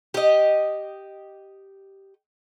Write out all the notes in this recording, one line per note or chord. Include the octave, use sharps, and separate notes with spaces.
G4 D#5